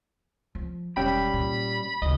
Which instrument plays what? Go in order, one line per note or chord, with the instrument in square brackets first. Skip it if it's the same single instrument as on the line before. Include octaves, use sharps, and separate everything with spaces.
[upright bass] F3
[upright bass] E1 [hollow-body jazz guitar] G3 C#4 G5 [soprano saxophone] B5
[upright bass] A#2
[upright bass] D2 C3 [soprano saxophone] D#5